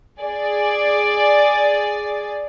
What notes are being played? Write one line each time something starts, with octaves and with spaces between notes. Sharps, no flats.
G#4 D5